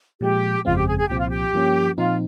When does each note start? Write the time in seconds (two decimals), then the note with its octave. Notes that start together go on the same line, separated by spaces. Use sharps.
0.21 A#2 F3 G#3 G4
0.65 G1 F2 C#3 G#3 C4 F4
0.76 G4
0.87 G#4
0.98 G#4
1.08 C2 A#2 F3 C4 G4
1.18 F4
1.28 G4
1.53 G2 F3 A#3 C#4
1.97 A#2 F3 C4 D#4 F4